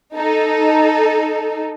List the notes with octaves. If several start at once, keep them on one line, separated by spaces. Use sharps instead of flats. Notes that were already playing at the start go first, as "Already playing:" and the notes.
D#4 A4